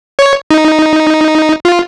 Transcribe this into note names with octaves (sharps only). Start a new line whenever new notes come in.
C#5
D#4
F4